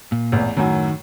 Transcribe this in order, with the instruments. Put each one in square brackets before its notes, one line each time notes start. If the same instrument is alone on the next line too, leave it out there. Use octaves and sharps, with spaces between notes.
[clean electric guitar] A#2
[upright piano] A1 E2
[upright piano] F#2 A2 F#3 [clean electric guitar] D#3